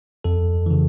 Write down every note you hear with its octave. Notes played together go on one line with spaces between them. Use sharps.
F2 A4
C#3 E3